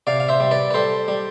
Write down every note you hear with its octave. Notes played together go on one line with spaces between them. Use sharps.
C3 D5 F5
F5
C5 E5
G3
B4 D5
B4
G3 A4 C5
G3